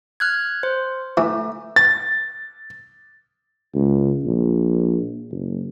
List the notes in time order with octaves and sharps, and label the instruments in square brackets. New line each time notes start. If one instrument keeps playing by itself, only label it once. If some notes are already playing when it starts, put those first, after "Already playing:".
[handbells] F6 F#6 G#6
C5
[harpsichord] E3 [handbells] A3
[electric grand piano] A6
[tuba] C#2
A#1
F#1